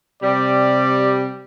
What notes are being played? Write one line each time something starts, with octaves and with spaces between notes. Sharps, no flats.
C3 G3 D5